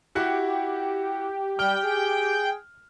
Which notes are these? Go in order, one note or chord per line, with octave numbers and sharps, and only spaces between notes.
E4 F#4 G4 F#5
G3 G5 F6
G#4